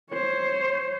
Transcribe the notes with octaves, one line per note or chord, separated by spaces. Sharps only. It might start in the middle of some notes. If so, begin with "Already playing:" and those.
C5 C#5